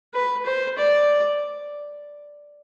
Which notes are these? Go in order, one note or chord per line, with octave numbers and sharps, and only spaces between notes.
B4
C5
D5